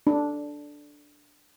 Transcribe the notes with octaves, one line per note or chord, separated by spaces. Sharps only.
D4